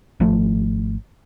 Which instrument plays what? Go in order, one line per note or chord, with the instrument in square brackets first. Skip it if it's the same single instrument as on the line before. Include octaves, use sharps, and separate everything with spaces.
[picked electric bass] G#1 F3 A3